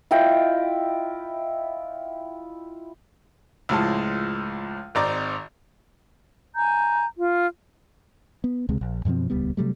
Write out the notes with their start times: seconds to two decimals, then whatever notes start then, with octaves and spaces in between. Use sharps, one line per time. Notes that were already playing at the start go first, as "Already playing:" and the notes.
0.11 E4 F4 D#5 G5
3.69 C#2 A2 F3 G#3 A5
4.95 G#1 C4 D#4 D5 A#5 D6
6.55 G#5 A#5 G6
7.17 F4
8.44 B3
8.69 C#2 C3 G#3
8.81 A#1
9.05 F#2 B2 F3 C4
9.30 D#1 C#2 G3 B3
9.57 C3 F#3 G3 A3